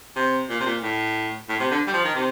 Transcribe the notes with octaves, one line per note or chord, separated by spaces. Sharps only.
C3
A#2
C3
A#2
A2
A2
C3
D3
G3
F3
D#3
C3